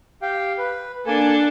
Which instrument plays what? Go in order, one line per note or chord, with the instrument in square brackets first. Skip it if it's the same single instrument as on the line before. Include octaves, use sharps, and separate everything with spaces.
[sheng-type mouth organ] G4 F5 G5
B4
[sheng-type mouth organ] A#3 G#5 [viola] D4 A4